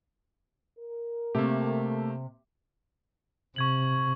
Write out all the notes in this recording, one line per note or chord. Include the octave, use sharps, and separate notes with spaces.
A#4
C3 A3 A#3 G4
C3 C#6 G#6 F#7